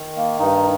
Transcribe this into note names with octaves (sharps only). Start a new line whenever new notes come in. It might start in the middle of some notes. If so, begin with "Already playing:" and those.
Already playing: D#3
A#3
G2 D#4